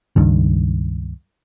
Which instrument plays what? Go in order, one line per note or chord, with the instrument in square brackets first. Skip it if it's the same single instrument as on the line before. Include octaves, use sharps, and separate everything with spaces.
[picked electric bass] C#2 G2 D#3